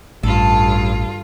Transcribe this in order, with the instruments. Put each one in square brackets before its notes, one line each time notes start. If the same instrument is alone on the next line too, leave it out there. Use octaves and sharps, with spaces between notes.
[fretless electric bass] A1 [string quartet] G2 F4 [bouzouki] A4